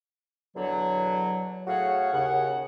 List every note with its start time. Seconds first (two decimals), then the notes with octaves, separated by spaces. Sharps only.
0.55 E2 B2 D3 F#3
1.67 A2 F#4 G#4 C#5 F5 F#5
2.12 D#2 C#3 F#5